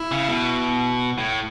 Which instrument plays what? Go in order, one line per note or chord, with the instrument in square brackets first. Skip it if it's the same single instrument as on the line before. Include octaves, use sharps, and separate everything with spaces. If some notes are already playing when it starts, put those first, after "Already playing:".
Already playing: [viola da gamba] E4
[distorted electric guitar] C#3
B2
A2